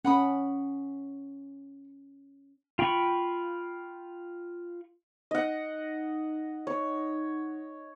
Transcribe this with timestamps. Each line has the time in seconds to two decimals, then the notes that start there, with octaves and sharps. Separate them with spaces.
0.05 C#4 F#5 B5 D#6
2.79 F4 G5 B5 C#6
5.31 D#4 D#5 F#5
6.67 C#5